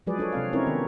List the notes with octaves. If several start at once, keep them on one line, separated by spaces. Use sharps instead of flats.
F3 F#3 G#3 G#4 B4 D5
D4 A4 C#5
C3 C4 F5
C4 C#4 D#4 E4 A#4 C#5
D#3 B3